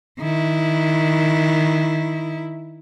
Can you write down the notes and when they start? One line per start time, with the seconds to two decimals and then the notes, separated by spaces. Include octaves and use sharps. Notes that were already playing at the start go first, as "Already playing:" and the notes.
0.19 D#3 E4